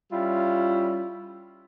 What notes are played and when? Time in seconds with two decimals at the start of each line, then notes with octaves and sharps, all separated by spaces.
0.12 G3 C#4 E4 F4